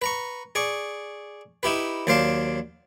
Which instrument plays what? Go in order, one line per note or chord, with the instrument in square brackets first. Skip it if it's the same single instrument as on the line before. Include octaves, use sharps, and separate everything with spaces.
[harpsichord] B4 A#5 C#6
G#4 D5 C#6
D#4 E4 G4 B4
D#2 F#3 C5 D5 F5 A5